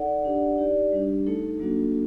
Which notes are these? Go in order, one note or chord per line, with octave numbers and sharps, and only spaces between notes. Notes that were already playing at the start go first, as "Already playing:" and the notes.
Already playing: D#4 A4 D5 F#5
D4 G4 D5 F#5
D#4 G4 D5
G3 D4 G4
A3 D#4 A4
F#3 A#3 D4 F#4 A4